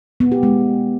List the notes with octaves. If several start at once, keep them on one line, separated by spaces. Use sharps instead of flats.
B3
G4
G#3